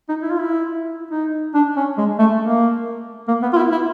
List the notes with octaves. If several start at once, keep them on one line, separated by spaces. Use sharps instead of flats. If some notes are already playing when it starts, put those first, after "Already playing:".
D#4
E4
F4
E4
D#4
D4
C#4
G#3
A3
A#3
A#3
B3
F4
E4
E4